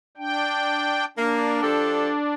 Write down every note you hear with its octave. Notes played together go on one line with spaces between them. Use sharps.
D4 G5
A#3 D4
F3 G4 A4